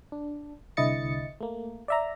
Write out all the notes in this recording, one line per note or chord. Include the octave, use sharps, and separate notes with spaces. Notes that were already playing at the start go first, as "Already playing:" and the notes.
D4
C2 D3 E4 D#5 A6 C#7
A3 A#3
D5 E5 A#5